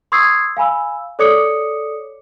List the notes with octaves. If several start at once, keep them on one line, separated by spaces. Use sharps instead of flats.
C6 C#6 D#6 E6 G#6 C7
F5 G#5 B5 E6
A4 C#5 D5 D6 D#6 C#7